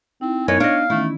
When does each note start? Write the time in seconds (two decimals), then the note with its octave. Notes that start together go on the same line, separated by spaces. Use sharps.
0.21 C4 D#4 E4
0.48 F#2 B3 D#4 B4 C#5 D#5 G#5
0.60 D4 D#5 F5
0.90 D#3 E3 A3 C#4 E4